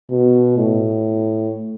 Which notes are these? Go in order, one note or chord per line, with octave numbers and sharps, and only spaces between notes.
B2
A2